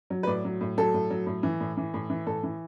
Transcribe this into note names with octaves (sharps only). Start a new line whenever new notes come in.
F#3
B4
A2 D5
F#3
A2
F#3 A4
A2
F#3
A2
E3
A2
E3
A2
E3
A2 A4
E3